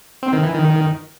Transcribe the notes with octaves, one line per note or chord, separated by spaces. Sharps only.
C4
D#3
E3
D#3